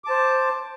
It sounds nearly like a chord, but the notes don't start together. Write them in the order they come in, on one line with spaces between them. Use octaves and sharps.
D6 A5 C5